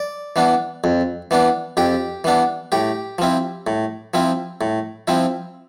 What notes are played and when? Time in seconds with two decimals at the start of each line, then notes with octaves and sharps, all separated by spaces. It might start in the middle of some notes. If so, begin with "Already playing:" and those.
Already playing: D5
0.36 E3 B3 D4
0.84 F2
1.31 E3 B3 D4
1.77 F2 G4
2.24 E3 B3 D4
2.72 A2 G4
3.18 F3 C4 E4
3.67 A2
4.14 F3 C4 E4
4.61 A2
5.08 F3 C4 E4